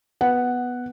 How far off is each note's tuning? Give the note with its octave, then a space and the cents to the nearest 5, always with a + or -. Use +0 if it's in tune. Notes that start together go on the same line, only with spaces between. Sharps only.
B3 +0 F#5 +0